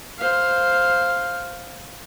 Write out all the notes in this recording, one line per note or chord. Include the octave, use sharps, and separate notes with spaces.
C5 F5